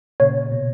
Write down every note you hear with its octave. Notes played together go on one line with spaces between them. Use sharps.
A#2 C#3 C#5
B2